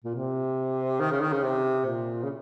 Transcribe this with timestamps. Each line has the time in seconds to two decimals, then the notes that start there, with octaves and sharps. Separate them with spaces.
0.05 A#2
0.15 C3
1.00 D#3
1.12 C#3
1.21 D#3
1.32 C#3
1.43 C3
1.86 A#2
2.23 C#3